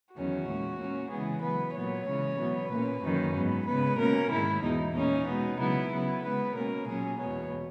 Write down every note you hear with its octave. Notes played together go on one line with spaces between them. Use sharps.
E2 D#3 F#3 C#4 F#4
A#2 G#3 C#4
A#2 A#3 C#4
C#3 E3 G#3 B3 G#4
C#3 F#3 B3 B4
A#2 F#3 B3 C#5
C#3 E3 G#3 C#4
B2 F#3 B3
A#2 A#3 C#4 B4
F#2 D#3 A#3 C#4
G#2 F#3 B3
C#3 G#3 B3 B4
B2 A#3 C#4 A#4
G#2 D#3 G#3 E4
E2 B2 G#3 D#4
A#2 A#3 C#4 D#4
B2 G#3 B3
C#3 F#3 B3 E4
C#3 F#3 B3
C#3 G#3 B3 B4
B2 A#3 C#4 A#4
A#2 F#3 C#4 G#4
E2 B2 G#3 B3 C#5